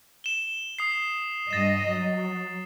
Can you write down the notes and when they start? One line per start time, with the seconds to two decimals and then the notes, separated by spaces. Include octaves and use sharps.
0.24 E7 G7
0.79 D#6 C7
1.50 G2 D#5 A6 E7
1.87 F#3